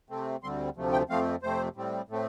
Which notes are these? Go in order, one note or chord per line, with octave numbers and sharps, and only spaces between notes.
C3 A3 C4
D2 D3 G3 C4 C6
D2 C3 F3 A3
G5
F2 F3 A3 C4 F5
F2 C3 A3 C4 C5
A2 G3 C4
A2 A3 C4